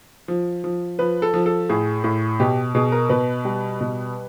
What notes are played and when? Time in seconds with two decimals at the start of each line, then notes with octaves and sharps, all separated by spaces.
0.28 F3
0.64 F3
0.99 F3 B4
1.22 A4
1.34 F3
1.46 A4
1.69 A2 G#4
2.04 A2
2.40 B2 G4
2.75 B2 G#4
2.92 A#4
3.09 B2 B4
3.45 G3
3.81 B2